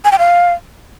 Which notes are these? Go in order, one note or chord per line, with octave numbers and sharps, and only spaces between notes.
G#5
G5
F5